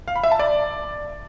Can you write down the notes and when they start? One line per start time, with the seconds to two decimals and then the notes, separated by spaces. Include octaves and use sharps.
0.08 F5
0.16 B5
0.23 E5
0.31 A5
0.39 D5